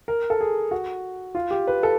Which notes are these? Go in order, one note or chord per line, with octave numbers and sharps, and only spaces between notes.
A#4
A4
G#4
F#4
F4
G4
B4
A4